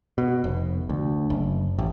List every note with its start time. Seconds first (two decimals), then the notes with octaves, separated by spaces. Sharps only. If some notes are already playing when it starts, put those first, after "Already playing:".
0.18 B2
0.44 F1
0.89 D2
1.30 F#1
1.78 A1